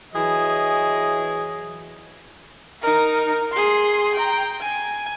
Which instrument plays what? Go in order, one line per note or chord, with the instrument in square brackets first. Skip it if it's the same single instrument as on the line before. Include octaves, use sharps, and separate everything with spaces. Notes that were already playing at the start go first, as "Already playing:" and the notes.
[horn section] E3 F#3 G#4 C#5 D#5
[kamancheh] D#4 A#4
G#4 C6
G5 A#5
G#5